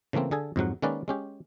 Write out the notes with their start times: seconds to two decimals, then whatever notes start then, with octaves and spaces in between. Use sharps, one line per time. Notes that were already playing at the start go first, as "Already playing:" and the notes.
0.13 C#3 E3 A3 A#3 C4
0.31 D3 G#4 A4 G#5
0.56 F2 G#2 F#3 F#5
0.82 D#3 G#3 A#3 C#4 B4 D5
1.08 G#3 C#4 G4